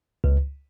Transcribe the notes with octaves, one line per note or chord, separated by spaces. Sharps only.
C#2